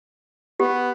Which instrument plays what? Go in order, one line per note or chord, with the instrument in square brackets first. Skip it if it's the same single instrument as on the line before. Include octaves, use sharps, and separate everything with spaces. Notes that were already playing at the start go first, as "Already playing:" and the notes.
[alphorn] B3 [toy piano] G4